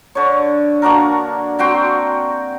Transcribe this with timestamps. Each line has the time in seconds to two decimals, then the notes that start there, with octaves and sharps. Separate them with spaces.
0.15 D3 C#5
0.82 A#3 D4 F#4 A#4
1.59 C4 F#4 G5 C6